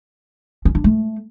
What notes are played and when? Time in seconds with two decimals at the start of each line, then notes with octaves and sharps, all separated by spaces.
0.65 C#4
0.75 D4
0.84 A3